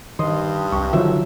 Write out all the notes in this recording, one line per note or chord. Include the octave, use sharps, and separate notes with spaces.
G2 D#3 C5 D#5
C2 C#6
D3 D#3 F3 F#3 E5